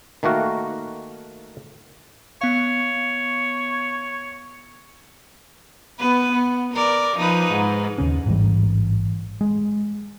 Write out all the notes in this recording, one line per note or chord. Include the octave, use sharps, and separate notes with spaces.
D#3 A3 A#3 F#4 A#4
B3 C#5 F5
B3 B4
B3
A#4 D5
F3 D#4 B4
G#2
D#2 C#3 C#4
A1 G#2 E3 G3
G#3